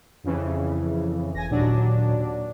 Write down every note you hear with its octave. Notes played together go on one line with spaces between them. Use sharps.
F2 C#3 E3
F#1 G#5 A#6
D#2 A#2 F#3 D4